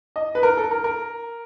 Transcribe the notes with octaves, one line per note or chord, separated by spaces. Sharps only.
D#5
B4
A#4
A4
A#4
A#4